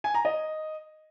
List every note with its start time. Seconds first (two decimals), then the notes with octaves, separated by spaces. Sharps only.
0.04 G#5
0.14 A#5
0.25 D#5